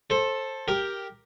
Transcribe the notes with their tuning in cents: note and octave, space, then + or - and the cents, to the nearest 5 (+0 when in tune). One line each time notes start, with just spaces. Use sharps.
A4 +0 C5 +25
G4 +0 A#4 +0